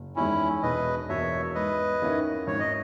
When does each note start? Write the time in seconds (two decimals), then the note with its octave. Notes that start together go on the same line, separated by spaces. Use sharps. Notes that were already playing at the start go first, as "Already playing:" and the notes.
Already playing: F#1
0.16 E2 D#3 G#3 C#4 E4
0.63 E1 B4 D#5
1.09 E2 B2 A#3 C#5 E5
1.55 G#2 B4 D#5
2.02 D#3 A#3 C#4 E4
2.47 G#1 C#5
2.60 D#5